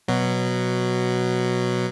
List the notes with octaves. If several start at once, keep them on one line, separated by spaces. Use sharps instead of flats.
B2 F#3